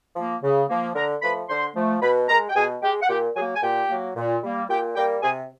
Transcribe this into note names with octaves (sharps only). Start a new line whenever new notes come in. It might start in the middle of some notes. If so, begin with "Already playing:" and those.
F3 A#3
C#3
F3 A#3
D3 A#4 A#5
F3 A3 B4 B5
D3 C5 C6
F3 A3
B2 B4 B5
G#3 A#4 A#5
G5
B2 G#4 G#5
G#3 G4 G5
F#5
A#2 G4 G5
F#3 A#3 G#4 G#5
G#5
A#2 G4 G5
F#3 A#3
A#2
G3 A#3
A#2 G4 G5
G3 A#3 G4 G5
C3 G#4 G#5